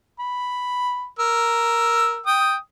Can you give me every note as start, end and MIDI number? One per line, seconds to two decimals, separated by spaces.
0.20 1.07 83
1.19 2.21 70
1.19 2.21 88
2.26 2.56 79
2.26 2.56 87